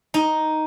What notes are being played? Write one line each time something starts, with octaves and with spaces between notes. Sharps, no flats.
D#4